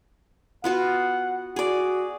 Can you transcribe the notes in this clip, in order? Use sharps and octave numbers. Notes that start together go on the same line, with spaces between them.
B3 F4 F#4 F#5
F#4 G#4 D5